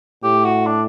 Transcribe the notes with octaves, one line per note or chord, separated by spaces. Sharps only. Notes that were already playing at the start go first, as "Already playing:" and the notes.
A2 G4
F#4
D4